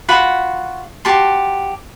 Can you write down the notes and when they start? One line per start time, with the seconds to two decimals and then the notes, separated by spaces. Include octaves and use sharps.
0.08 F4 F#4 F#5 B5
1.05 F#4 G4 A5 C6